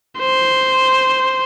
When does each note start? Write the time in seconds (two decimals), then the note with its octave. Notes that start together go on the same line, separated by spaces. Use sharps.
0.19 C5